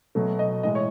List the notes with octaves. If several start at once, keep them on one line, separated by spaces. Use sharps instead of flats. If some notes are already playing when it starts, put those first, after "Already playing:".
B2 F#3 A3
D#5
A2 E3 G#3 D#5
C#5